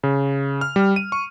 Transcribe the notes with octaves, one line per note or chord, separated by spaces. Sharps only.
C#3
F6
G3
D#7
C#6